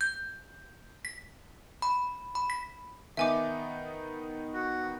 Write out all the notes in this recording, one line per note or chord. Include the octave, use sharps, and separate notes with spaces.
G6
B6
B5
B5
B6
D#3 B3 D#4 E5 G#5 D6
F#4